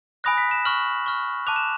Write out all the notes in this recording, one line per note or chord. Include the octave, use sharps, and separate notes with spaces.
G#5 B5 D#6 F#6 A#6
B6
E7
C#6 F6 F#7
C#6 F6
A5 D6 F#6 F7
E7